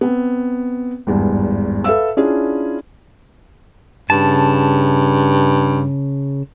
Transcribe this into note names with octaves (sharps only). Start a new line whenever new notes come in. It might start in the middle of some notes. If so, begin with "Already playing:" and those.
B3 C4
G#1 E2 G2
A4 B4 E5 F5 E6
C#4 D4 E4 F4 G#4
G2 C#3 A5